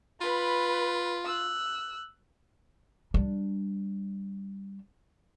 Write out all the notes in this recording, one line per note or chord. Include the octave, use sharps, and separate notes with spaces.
F4 B4 B5
E6 F#6
G3 D4